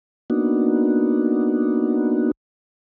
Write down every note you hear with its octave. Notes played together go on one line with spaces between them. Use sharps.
A#3 B3 D4 D#4 F#4